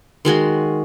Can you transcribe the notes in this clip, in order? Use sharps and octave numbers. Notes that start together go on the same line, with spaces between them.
D#3 G#3 F#4 C6